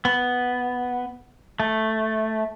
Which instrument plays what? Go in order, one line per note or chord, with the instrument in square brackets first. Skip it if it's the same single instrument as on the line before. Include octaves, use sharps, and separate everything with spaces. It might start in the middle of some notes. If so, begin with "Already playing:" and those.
[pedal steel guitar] B3
A3